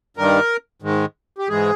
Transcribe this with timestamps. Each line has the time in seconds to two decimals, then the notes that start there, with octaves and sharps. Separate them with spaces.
0.17 G2 D#3 G3 A#4
0.82 G#2 D#3 G#3
1.38 G4
1.48 G#2 E3 G#3 G#4